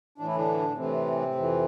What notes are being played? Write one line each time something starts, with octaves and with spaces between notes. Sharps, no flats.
A2 E3 D4
E4
D3 D4
A2 C3 E3 C4
F2 E3